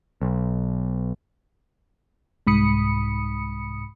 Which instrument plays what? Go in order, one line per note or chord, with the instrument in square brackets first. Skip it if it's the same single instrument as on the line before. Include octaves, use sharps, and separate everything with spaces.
[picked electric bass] B1
[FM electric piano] C2 G#2 B5 D#6 C#7